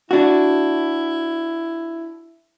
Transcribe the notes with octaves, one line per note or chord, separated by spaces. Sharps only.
D4 E4 F#4